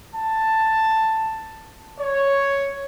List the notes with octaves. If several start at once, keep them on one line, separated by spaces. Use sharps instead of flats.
A5
C#5